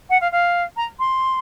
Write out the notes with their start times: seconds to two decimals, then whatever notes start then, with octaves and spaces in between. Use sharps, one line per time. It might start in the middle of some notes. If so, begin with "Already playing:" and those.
0.09 F#5
0.21 F5
0.31 F5
0.76 A#5
0.99 C6